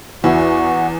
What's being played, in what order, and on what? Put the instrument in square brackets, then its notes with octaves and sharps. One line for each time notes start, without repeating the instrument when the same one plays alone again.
[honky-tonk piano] E2 [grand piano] E4 [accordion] F#4